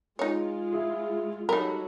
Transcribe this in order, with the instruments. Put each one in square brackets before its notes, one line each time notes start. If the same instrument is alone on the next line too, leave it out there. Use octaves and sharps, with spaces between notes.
[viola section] G#3 F4 [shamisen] D#4 C#5
[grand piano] E4 G#4
[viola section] F#3 G3 F#4 [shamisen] D#4 A#4 [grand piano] A4 B5